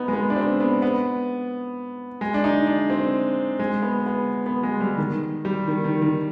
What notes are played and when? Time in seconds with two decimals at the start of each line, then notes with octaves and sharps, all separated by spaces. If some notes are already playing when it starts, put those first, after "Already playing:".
Already playing: B3 D#4
0.08 G#3
0.13 B3
0.30 D4
0.36 C4
0.60 B3
0.82 B3
2.21 G#3
2.34 D4
2.44 D#4
2.67 D4
2.90 C4
3.59 G#3
3.82 B3
4.06 B3
4.46 B3
4.63 G#3
4.80 G3
4.98 D#3
5.45 G3
5.67 D#3
5.84 D#3
6.02 D#3